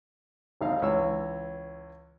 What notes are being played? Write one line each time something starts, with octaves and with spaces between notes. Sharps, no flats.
G#1 D#2 D#4 F5
C#2 E3 C#5 E6